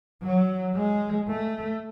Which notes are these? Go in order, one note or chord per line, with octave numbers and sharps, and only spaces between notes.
F#3
G#3
A3